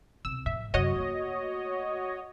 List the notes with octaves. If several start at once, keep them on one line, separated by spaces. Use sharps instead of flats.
C2 B2 E6
F2 A2 E5
F#2 C3 F#4 C#5 D#5
A3 A#3